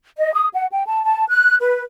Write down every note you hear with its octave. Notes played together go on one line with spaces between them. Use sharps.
D#5
D#6
F#5
G5
A5
A5
F#6
B4